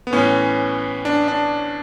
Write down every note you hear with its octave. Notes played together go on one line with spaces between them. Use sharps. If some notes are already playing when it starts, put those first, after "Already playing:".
B3
A2 E3 C#4
D4
D4